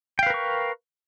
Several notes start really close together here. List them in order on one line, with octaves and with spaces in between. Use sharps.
G5 F5 B4 A#4 C#6